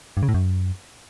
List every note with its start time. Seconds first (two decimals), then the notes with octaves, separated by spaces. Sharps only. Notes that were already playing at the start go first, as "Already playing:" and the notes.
0.17 G2
0.23 C#3
0.28 A2
0.34 F#2